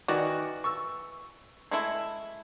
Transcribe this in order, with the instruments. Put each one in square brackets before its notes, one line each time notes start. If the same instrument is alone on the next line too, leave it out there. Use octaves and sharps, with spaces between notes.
[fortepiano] D#3 F#4 D5 [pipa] E3
[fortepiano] C#6 E6
[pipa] G#3 A3 E4